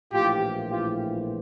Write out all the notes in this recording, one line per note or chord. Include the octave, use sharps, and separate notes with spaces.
A#1 A2 E3 F4 G4
F4 G4